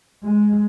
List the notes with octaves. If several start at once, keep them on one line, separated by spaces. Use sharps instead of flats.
G#3